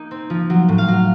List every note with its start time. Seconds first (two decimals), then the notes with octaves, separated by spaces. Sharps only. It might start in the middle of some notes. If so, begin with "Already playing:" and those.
Already playing: A#3 D#4
0.11 C4
0.30 F3
0.50 F#3
0.68 A2
0.78 F5
0.88 F#3